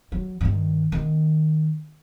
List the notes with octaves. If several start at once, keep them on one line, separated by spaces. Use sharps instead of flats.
F#3
G2 D#3
D#3 B3